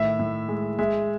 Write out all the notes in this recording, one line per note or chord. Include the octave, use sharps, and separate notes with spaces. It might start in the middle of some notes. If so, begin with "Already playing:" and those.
Already playing: A2 D#3 E5
A2
G#3
G#3 E5